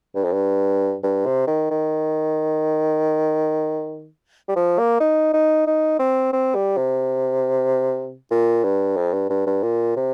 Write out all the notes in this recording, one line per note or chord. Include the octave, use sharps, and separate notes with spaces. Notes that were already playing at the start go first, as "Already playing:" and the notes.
G2
F2
G2
G2
C3
D#3
D#3
G3
F3
A#3
D#4
D#4
D#4
C4
C4
G3
C3
A#2
G2
F2
G2
G2
G2
A#2
C3